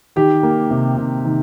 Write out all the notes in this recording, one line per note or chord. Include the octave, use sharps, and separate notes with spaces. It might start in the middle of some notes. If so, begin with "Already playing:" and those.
D#3 G4
A#3
C3
C3
D#3